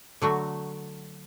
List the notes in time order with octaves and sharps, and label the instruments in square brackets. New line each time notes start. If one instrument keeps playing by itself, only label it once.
[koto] D3 F#3 A3 F#4